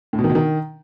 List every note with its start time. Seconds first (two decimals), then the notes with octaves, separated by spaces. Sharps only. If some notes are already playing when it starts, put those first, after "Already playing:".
0.13 A2
0.19 B2
0.24 D#3
0.30 B2
0.35 D#3